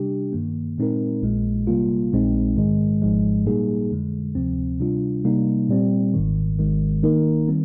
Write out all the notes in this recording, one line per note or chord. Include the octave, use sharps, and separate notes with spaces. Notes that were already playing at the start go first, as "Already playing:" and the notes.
Already playing: C3 G3 D4 G4
G2 D#3 A#3
A#2 G#3 C4 D#4 A#4
A#1 A#2 G#3
C3 G3 A#3 F4
A#1 A#2 G#3 C4 D#4
G#2 D#3 G#3
G#1 G#2 F3 G#3
A#2 G3 A#3 D#4 G#4
F2 D3 G#3
D2 C3 F3 C4
C3 G3 D4 F4
C3 G3 A#3 D#4
A#2 G3 C4
G#1 G#2 D#3
G#1 G#2 D#3 G#3
D#3 A#3 D#4 A#4
D#3 G3 C4